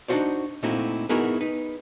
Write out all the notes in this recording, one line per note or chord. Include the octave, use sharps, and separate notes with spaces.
D4 D#4 F4 F#4 C5 D5
A#2 A3 C4 D#4 E4 F#4
B3 D#4 E4 F#4 G#4 A#4
D#4 B4